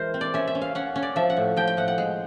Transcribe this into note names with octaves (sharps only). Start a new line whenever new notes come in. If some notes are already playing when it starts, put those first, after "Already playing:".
Already playing: E3 G#3 A#4 C5
C4
D5
C#4 E5
E5
C#4
F5
C#4 F#5
C#4
D5
F3 E5
F#5
A2
F3 G5
G5
A2 F#5
F#5
G#3